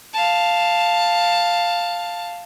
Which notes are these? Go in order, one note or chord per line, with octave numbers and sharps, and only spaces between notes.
F5 A5